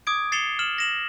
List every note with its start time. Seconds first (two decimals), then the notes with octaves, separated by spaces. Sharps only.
0.07 D6 D#6 G#6 D7
0.32 A6 C7 C#7 E7 F7 G7
0.59 F6 C7 E7 F#7
0.78 A#6 E7 F#7